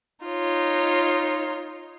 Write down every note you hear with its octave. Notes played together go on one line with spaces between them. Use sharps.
D#4 F4 C#5